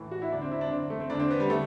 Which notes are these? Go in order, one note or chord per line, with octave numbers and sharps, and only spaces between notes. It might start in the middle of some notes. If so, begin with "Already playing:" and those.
Already playing: A2 E3
F#4
E4
E2 D3 D4
C4
E4
D4
F#2 D3 C4
A3
C4
E2 D3 D4
C4
B3
G3
D3 A3